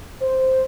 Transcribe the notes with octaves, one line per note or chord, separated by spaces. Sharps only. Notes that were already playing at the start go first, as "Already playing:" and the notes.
C5